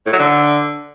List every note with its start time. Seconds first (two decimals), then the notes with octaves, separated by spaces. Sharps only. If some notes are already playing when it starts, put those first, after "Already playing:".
0.06 A2
0.13 F#3
0.19 D3